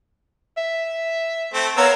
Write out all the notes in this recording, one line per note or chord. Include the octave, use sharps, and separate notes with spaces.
E5
A3 C4
B3 A#4 C#5 F5 E6